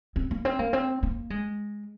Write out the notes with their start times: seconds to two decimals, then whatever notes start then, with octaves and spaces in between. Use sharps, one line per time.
0.16 C4
0.31 A#3
0.45 C4
0.59 A#3
0.73 C4
1.03 A#3
1.30 G#3